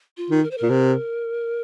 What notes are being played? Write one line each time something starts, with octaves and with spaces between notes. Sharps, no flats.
F4
D#3
A#4
C5
A#2 A#4
C3